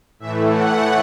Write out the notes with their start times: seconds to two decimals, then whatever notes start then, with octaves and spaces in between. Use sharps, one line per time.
0.19 A2 E3 A3 E5
0.49 F#5